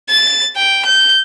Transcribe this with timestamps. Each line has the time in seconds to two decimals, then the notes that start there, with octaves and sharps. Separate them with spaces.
0.10 A6
0.57 G5
0.86 G6